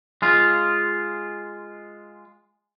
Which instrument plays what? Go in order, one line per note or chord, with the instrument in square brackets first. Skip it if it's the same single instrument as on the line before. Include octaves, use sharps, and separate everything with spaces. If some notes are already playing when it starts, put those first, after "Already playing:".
[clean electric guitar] G#3 F4